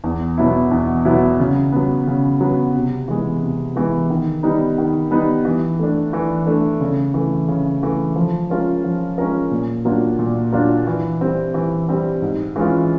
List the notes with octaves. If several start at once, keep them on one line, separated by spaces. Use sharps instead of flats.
E2
B2 F#3 B3 E4
E2
B2 F#3 B3 E4
C#3
F#3 B3
C#3
F#3 B3
C3
E3 G#3 B3
C3
E3 G#3 B3
D#3
G3 B3 D#4
D#3
G3 B3 D#4
E3
A3 D4
E3
A3 D4
C#3
E3 A3
C#3
E3 A3
F3
G#3 C#4 F4 A#4
F3
G#3 C#4 F4 A#4
A#2
F#3 A#3 D4 F4
A#2
F#3 A#3 D4 F4
E3
G3 C4
E3
G3 C4
G#2
E3 G#3 C#4 F4